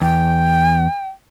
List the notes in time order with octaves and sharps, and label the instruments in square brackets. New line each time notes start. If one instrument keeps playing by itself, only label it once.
[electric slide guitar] E2 [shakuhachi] G5